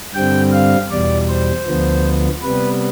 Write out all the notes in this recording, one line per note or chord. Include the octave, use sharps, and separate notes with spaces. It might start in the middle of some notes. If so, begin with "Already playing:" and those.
G2 D3 G3 C4 G5
F5
E2 B2 G3 D5
C5
D2 D3 F3 B3
C3 G3 B3 B4